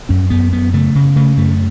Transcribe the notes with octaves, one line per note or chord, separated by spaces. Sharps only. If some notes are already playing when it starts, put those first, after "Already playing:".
F#2 C#4
F#2 B3
F#2 B3
C#3 A3
C#3
C#3 A3
F#2 A3